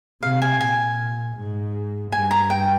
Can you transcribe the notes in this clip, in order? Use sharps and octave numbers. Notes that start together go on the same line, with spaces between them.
C3 F5
G#5
A#2 G#5
G#2
G2 G#5
A#5
G5